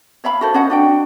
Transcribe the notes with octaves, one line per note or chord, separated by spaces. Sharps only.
C#5 E5 F5 B5
F#4 A4 C5
C#4 D#5 F#5
D4 F#4 G5